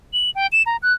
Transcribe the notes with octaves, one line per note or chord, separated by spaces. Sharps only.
F#7
G5
E7
A#5
F#6